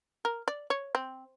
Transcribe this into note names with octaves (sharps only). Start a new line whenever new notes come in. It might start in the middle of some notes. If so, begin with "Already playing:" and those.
A#4
D5
C#5
C4